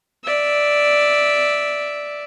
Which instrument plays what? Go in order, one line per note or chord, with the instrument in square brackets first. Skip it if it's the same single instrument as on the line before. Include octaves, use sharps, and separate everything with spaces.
[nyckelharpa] D5 E5